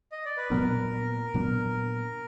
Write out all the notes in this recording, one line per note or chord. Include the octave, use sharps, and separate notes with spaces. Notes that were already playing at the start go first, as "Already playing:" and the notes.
D#5
D5
B4
A#2 F#3 B3 D4 A#4
A#2 F#3 B3 D4